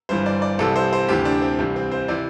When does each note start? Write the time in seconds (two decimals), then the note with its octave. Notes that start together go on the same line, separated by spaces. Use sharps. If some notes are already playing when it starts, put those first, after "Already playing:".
0.09 G1 G2 E3 C5
0.26 D5
0.42 D5
0.59 C2 C3 E3 A4
0.76 C5
0.93 C5
1.08 D2 C3 E3 G4
1.25 D4
1.42 C4
1.59 C2 C3 E3
1.76 C4
1.91 C5
2.08 C3 E3 D5